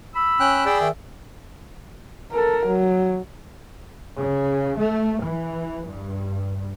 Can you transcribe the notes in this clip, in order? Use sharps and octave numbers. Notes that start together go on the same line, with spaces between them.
B5 E6
C#4 G5 F#6
G#4 D5 G5
D#3 E5
A4 A#4
F#3
C#3
A3
E3
G2